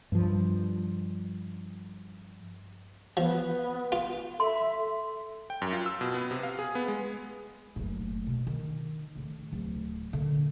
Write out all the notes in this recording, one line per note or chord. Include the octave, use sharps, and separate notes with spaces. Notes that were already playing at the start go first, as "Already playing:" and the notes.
G2 F3
F3 B3
F4
A4 E5 C6
G5
F#2
F4
E6
B2
B3
C3
F5
G#4
B3
G#3
F#1 A2
B2
D#3
A2 C#3
D1
A#2 D3